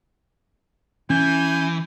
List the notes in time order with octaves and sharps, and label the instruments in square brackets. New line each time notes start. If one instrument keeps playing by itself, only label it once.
[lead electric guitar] E3 [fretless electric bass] C#4 [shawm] G#5 [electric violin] G6